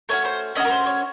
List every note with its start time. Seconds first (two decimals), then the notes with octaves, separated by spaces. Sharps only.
0.09 A3 C#4 F#4 C#5
0.25 C5
0.55 A3 C#4 F#4 D#5
0.65 A#4
0.71 C5
0.86 C#5